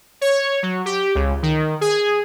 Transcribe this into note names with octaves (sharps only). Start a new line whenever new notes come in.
C#5
F#3
G4
C#2
D#3
G#4